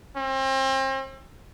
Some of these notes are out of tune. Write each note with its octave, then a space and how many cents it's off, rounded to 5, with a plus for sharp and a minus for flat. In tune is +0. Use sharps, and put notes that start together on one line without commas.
C4 +35